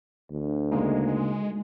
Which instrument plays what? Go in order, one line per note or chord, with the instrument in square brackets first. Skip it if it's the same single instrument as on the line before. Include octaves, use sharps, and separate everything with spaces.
[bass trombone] D2
[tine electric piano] C#3 A#3 D#4 [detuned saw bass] G#3